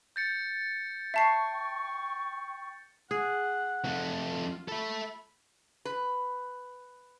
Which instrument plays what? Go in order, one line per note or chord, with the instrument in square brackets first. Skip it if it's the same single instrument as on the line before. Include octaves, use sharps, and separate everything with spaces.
[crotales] G6 A6 C#7
[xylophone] E5 A5 C7 [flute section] G5 C#6
[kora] G#4 [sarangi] F#5
[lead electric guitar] F2 A3
[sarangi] F4
[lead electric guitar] A4 E5 [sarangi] B5
[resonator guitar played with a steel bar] B4